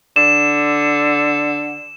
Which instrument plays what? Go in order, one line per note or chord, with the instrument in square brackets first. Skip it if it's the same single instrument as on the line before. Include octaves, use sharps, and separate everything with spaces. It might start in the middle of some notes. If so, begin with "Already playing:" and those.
[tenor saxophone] D3 [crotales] E7